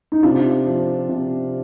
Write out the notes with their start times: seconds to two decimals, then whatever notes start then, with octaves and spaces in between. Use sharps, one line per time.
0.12 D#4
0.23 C3 D4 F4
0.66 F3
1.09 C3